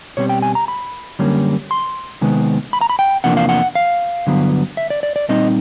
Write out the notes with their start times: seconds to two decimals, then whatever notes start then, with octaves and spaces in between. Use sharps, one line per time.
0.17 B2 G3 C4 C#5
0.29 G5
0.42 G#5
0.55 A#5
0.68 B5
1.19 F#2 D3 G3 A#3 C#4
1.71 C6
2.21 C3 D#3 G#3 B3
2.73 B5
2.81 A#5
2.89 B5
2.99 G5
3.24 E2 C3 F3 A#3 D4 F#5
3.37 F5
3.49 F#5
3.75 F5
4.27 G2 D3 F#3 B3
4.77 E5
4.90 D5
5.03 D5
5.16 D5
5.29 A#2 G3 C4 D#4 D#5